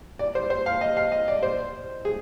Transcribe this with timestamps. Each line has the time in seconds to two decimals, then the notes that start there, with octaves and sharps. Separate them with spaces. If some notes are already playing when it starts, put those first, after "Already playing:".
0.19 D5
0.35 C5
0.50 C5
0.66 F5
0.81 D#5
0.97 F5
1.12 D#5
1.28 D5
1.43 C5
2.05 G#4